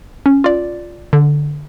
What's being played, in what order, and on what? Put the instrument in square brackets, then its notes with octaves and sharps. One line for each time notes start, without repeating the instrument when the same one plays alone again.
[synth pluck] C#4
F4 D5
D3